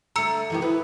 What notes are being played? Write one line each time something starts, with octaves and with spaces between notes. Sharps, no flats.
D3 A3 A#5 E6 C#7
C3 D#3 E3 G4
E4 B4